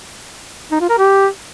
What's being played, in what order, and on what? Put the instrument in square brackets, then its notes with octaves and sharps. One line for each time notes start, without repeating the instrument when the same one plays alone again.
[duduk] D#4
F4
A#4
G4